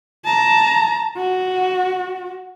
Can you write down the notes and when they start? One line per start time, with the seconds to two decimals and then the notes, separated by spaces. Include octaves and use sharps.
0.25 A5 A#5
1.16 F#4